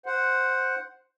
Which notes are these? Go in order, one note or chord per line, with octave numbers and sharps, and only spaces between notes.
C5 F#5